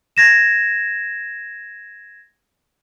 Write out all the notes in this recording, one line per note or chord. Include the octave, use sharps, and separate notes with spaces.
G#6 A#6 E7